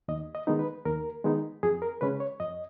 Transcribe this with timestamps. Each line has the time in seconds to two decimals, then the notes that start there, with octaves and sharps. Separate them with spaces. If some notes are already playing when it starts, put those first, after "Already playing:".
0.08 D#2 D#5
0.35 D#5
0.47 D#3 G#3 B3 D#4
0.59 B4
0.85 D#2 A#4
1.24 D#3 G#3 B3 D#4
1.63 F2 G#4
1.82 A#4
2.01 C#3 G#3 C#4 B4
2.20 C#5
2.40 F2 D#5